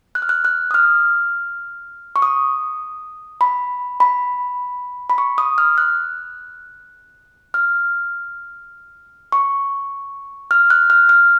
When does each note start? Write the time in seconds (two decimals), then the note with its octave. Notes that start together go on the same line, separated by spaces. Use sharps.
0.15 F#6
0.22 F6
0.29 F#6
0.45 F#6
0.71 D#6
0.74 F6
2.16 C#6
2.22 D#6
3.41 B5
4.00 B5
5.10 B5
5.18 C#6
5.38 D#6
5.58 F6
5.78 F#6
7.54 F6
9.32 C#6
10.51 F6
10.70 F#6
10.90 F6
11.09 F6